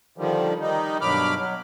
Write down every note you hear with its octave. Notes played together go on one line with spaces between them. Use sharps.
D3 D#3 F3 G3
D#3 G3 D#4
G2 B2 F#3 B5 D6 F6
F#3